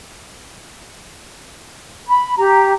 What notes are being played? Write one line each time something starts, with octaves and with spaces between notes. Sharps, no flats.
B5
G4 A#5